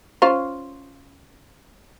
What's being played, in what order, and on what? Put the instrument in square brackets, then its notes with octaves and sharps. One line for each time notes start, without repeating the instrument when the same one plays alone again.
[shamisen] C#4 F4 C5